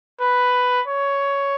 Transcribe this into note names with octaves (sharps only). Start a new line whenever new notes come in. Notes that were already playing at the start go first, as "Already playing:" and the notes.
B4
C#5